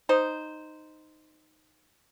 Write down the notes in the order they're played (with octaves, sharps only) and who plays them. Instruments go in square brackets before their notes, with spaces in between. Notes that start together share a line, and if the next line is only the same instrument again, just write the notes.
[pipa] D#4 C5